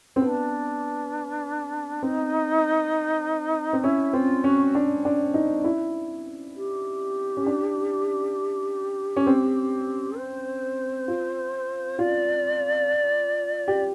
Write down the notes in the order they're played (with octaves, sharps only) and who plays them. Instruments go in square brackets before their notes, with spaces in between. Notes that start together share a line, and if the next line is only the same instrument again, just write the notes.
[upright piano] C4
[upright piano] B3 [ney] D4
[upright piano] C4 [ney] D#4
[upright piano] C4
[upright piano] C#4 [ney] E4
[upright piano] C4 [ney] F4
[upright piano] C#4 [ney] F#4
[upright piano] D4
D4
D#4
E4
[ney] G4
[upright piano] C#4
D4
C#4
C4
[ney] C5
[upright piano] F4
[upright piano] F4 [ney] D5
[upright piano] G4